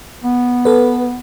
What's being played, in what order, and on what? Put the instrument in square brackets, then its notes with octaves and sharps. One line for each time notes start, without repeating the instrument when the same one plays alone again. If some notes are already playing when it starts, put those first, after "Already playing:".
[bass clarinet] B3
[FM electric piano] A4 B4